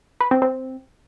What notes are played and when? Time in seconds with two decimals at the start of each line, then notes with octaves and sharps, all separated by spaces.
0.21 B4
0.31 C4
0.42 C4